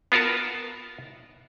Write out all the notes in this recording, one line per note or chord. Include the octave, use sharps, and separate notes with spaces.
B3 F4 F#4 A#4 A5